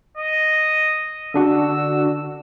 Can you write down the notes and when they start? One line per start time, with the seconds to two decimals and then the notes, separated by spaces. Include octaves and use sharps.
0.17 D#5
1.34 D3 D4 F#4 E6